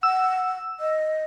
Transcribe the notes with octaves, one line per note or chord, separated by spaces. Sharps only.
F#5 E6
D#5